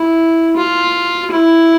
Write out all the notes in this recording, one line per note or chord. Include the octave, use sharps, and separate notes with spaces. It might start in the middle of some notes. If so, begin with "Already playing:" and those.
Already playing: E4
F4
E4